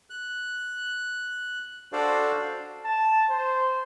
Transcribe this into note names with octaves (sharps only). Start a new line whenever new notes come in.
F#6
D4 F#4 A4 C5 D5 F5
A5
C5